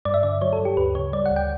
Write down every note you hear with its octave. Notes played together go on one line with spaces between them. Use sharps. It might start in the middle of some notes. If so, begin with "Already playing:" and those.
G2 D5
E5
D3 D5
F#3 C#5
A4
G2
G4
D2 B4
C#3 C#5
G3 D5
F#5
D2
G5